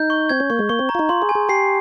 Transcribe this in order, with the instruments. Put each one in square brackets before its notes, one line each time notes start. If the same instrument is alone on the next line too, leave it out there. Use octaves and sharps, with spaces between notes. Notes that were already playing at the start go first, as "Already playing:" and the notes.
Already playing: [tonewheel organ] D#4 [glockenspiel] G6
[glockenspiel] C#6
[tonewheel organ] C4 [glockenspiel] G#6
[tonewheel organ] C#4
[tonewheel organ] A#3 [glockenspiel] C#6
[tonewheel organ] G#3
[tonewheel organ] A#3 [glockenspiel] C#6
[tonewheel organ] C4
[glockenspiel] A#5
[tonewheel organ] F4
D#4
[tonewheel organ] F4 [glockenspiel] C6
[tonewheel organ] G#4
[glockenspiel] G#5
[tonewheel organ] G#4
[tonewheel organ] G4 [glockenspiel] C7